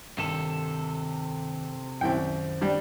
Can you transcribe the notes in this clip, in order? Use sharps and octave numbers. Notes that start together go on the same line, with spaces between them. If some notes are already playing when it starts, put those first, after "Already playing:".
G2 C3 D#3 A4
C2 F#2 D#3 E4 C5 G5
G3 D4